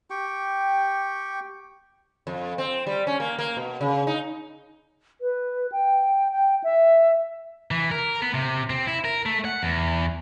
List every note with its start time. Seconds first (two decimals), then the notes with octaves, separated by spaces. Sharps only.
0.10 G4 G5 C#6
2.27 F2
2.58 C4
2.87 G3
3.07 C#4
3.20 A#3
3.39 A#3
3.57 B2
3.81 C#3
4.07 D#4
5.21 B4
5.72 G5
6.31 G5
6.64 E5
7.71 E3
7.91 A#4
8.22 B3
8.34 C3
8.70 C4
8.87 E4
9.05 A#4
9.26 A3
9.45 F#5
9.63 E2